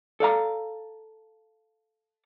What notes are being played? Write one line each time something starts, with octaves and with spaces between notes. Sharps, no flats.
A4 D5 F5 A#5